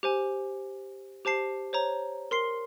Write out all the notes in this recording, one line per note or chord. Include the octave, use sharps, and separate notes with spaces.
G4 C5 G#5
G4 C5 A5 C7
C5 C#5 A#5
A#4 C6 C7